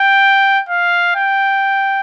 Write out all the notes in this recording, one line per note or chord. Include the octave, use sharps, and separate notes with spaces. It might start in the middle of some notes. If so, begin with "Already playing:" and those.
Already playing: G5
F5
G5